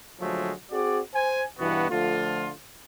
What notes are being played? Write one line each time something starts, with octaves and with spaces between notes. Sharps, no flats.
D3 F3 F#3 G#3 A3
C4 F#4 G#4 D5
C5 G#5
G2 B2 E3 B3 F#4
D3 F3 A3 F4